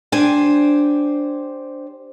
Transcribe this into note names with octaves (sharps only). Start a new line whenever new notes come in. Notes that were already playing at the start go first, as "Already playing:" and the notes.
D4 G4 C5 G#5